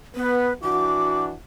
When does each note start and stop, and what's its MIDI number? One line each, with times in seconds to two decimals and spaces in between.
0.15 0.50 59
0.15 0.53 71
0.62 1.32 52
0.62 1.32 62
0.62 1.32 66
0.62 1.24 86